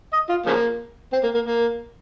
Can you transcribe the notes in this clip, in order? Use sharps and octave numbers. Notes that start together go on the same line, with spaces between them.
D#5
F4
C#3 F3 A#3
C4
A#3
A#3
A#3